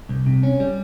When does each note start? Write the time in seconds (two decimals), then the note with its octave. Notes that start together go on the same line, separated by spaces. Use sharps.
0.09 C2
0.26 C3
0.43 C#4
0.60 G3